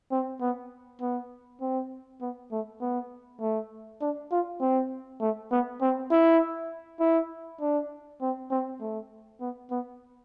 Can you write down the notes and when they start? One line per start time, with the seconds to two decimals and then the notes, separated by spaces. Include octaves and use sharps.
0.12 C4
0.41 B3
1.02 B3
1.61 C4
2.21 B3
2.52 A3
2.81 B3
3.41 A3
4.01 D4
4.31 F4
4.61 C4
5.21 A3
5.51 B3
5.81 C4
6.11 E4
7.00 E4
7.61 D4
8.21 C4
8.51 C4
8.81 A3
9.41 B3
9.71 B3